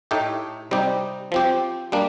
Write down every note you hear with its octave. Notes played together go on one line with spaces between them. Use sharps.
A2 A3 D#4 G4
C3 G3 C4 D#4 G4
F3 C4 G4
G3 A#3 D4